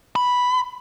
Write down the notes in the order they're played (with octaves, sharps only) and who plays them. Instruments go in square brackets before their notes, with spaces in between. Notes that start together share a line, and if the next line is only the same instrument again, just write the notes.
[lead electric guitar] B5